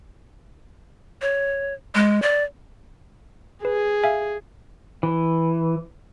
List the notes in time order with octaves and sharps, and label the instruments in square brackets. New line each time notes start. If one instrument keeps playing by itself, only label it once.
[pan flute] C#5
G#3
D5
[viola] G#4 [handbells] B4
[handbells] E5 F5 G#5
[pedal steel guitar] E3